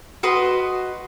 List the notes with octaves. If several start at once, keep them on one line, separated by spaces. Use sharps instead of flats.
F#4 B4 D#5 C6